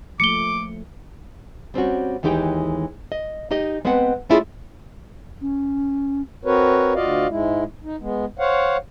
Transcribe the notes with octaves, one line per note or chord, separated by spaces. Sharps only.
F3 A3 A#3 D6 C#7 G7
G3 C4 C#4 F#4
D#2 E3 G#3 D#4 G4 G5
D#5
D#4 G4 D#5
G#3 B3 C4 B4 F#5
G#3 A3 C#4 E4 F4 G#4
C#4
C4 F#4 A#4 B4 C#5
D2 F4 F#4 D5 D#5 F5
G#2 G#3 E4
D#4
G#3 B3
C5 C#5 F5 F#5